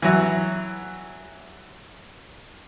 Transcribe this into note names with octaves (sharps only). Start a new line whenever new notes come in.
E3 F#3